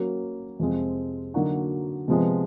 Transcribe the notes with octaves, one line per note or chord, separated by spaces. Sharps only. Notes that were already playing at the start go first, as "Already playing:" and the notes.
Already playing: F#3 A#3 C#4 F#4
F2 C3 F3 G#3 C4
D3 F#3 A#3 D#4 F#4
C3 F3 G#3 B3